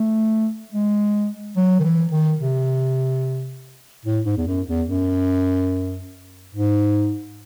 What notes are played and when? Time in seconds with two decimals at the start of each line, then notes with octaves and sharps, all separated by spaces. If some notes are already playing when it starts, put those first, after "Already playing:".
Already playing: A3
0.73 G#3
1.57 F#3
1.80 D#3
1.84 E3
2.12 D#3
2.39 C3
4.05 A2
4.25 G#2
4.37 E2
4.47 F#2
4.68 E2
4.88 F#2
6.55 G#2